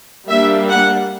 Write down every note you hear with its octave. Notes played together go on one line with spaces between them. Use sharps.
G3 A#3 D4 E5
F#5